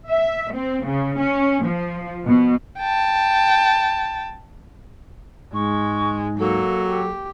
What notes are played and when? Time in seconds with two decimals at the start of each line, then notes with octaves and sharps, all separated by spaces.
0.10 E5
0.53 C4
0.87 C#3
1.20 C#4
1.64 F3
2.26 B2
2.79 G5 A5
5.54 G#2 G#3 C#6
6.39 F#3 A#3 A4
6.88 G4